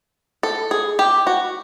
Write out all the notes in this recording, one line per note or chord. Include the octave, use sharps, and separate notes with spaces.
A4
G#4
G4
F#4